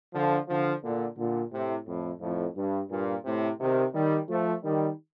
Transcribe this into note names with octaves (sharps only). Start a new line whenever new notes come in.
D3 F3
D3 F3
A#2 D3
A#2 D3
A2 C3
F2 A2
F2 A2
G2
G2 A#2
A2 C3
C3 D#3
D#3 G3
F3 A3
D#3 G3